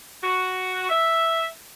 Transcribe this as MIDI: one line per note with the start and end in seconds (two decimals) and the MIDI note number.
0.22 0.86 66
0.89 1.46 76